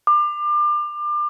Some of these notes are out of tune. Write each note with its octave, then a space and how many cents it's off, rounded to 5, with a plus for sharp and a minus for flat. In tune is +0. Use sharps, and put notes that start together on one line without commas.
D6 +30